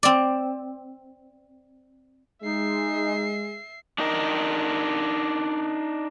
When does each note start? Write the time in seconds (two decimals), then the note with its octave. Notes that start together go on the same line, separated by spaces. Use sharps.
0.03 C4 D5
2.43 G#3 D#4 E5 C7
3.98 D4 D#4 A#4